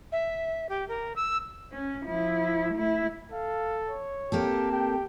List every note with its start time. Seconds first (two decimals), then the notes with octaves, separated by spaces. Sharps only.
0.12 E5
0.69 G4
0.88 A#4
1.16 E6
1.72 C#4
2.06 F3 E4
2.74 A3 E4
3.32 A4 F5
3.89 C#5
4.32 A#3 C4 G4 A4
4.72 G4 G5